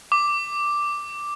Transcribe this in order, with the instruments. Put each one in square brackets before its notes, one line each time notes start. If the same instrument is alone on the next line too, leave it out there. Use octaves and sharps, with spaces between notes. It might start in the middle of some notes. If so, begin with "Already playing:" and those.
[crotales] D6